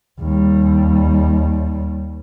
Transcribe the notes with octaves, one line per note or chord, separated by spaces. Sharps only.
D#2 G3